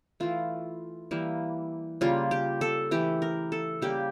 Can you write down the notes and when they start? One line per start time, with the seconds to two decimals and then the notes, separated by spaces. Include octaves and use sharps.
0.20 E3 A3 F4
1.11 E3 G3 A#3
2.01 C#3 G3 A#3 F4
2.31 G4
2.61 A4
2.91 E3 A3 G4
3.22 A#4
3.52 A4
3.82 C#3 G3 A#3 G4